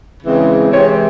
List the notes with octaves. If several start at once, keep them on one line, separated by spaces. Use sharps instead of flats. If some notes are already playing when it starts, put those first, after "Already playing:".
C#3 E3 G#3 C4
C3 E3 G#3 C4 C#5